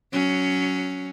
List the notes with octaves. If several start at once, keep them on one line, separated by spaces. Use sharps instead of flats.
F#3 C#4